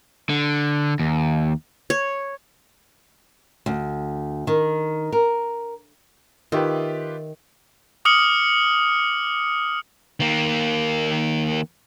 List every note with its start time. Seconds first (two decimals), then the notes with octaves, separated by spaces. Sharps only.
0.29 D3
0.99 D#2
1.90 C#5
3.66 D2
4.47 D#3
5.12 A#4
6.52 D#3 F4 G4 B4 E5
8.05 D6 D#6 F6 C#7 F#7
10.20 D#3 A#3